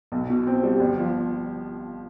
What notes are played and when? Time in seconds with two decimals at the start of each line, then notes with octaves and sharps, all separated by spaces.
0.12 B1
0.30 B2
0.47 C4
0.63 G3
0.80 G1
0.98 F3